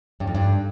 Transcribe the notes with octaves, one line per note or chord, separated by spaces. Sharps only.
G2
F2
G2